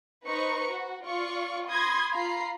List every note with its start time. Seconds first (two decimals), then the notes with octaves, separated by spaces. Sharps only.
0.25 D#4 B4 C5 A#5 C#6 C#7
0.70 F#4
1.04 F4 D5 F5 C#6
1.68 B5 C6 D#6 G#6 A#6
2.10 F4 A#5 B5 C7